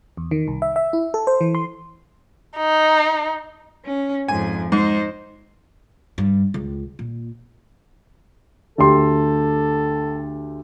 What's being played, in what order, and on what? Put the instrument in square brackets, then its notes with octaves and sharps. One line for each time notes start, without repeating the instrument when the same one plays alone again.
[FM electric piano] E2
D#3
C2
E5
E5
E4
A4
C5
E3
C6
[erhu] D#4
[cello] C#4
[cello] F2 G#2 [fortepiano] G#5
[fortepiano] G#2 [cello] D#4 C5
[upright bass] G2
C#2
A#2
[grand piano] D2 G4 C6 [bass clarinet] A4